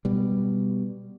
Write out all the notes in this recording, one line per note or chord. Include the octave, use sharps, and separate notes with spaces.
B2 G3